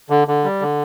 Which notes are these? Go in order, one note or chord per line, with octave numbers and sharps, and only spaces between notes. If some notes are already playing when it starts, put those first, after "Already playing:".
D3
D3
G3
D3